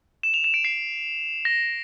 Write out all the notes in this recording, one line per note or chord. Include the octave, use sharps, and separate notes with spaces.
E7
F7
E7
D7
C7
A#6